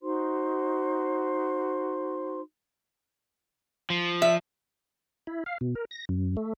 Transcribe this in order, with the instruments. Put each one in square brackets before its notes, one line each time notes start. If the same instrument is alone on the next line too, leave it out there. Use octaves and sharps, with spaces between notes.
[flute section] D#4 F#4 C5 C6
[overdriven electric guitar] F3
[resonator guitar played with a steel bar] E5
[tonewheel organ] E4
F5
B2
A#4
A#6
F#2
A3